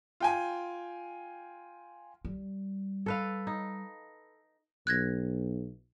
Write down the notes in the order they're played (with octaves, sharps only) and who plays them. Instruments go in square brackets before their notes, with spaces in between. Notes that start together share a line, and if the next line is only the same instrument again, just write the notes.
[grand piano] F4 G5 G#5
[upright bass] G3
[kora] A4 B4 F5
D#4
[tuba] B1 [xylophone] F#6 G#6 A#6